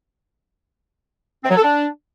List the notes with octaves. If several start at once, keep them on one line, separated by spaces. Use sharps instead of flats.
C4
F#3
A4
D4